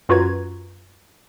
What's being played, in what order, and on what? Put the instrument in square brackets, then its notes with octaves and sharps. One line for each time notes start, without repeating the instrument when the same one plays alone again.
[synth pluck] F#2 F4 F#4 B4 A#5 G#6